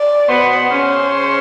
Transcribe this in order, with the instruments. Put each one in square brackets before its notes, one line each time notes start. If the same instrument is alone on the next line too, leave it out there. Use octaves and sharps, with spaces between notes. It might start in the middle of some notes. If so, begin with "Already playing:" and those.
Already playing: [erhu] D5
[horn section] B2 B3 [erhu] C5
[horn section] C#3 C#4